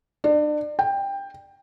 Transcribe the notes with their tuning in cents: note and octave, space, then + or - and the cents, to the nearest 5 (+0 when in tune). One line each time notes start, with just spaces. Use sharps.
D4 +35
G5 +15